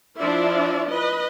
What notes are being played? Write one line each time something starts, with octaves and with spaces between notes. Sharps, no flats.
F3 D4 E4 F4 D5 E5
B4 D#5